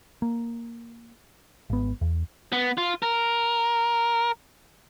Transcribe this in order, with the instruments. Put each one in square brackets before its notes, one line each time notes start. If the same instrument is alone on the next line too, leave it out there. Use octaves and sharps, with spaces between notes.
[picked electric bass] A#3
G#1 B3
E2
[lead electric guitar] B3
F4
A#4